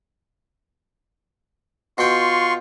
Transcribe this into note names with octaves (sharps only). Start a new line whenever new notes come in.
B2 F4 G5 C6 C#6